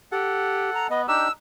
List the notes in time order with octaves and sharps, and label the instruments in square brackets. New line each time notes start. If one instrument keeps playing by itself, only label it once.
[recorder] G4 [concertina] A4 F#5
[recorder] A#5
[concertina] B3 [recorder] D#5
[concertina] D4 D#4 G4 [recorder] E6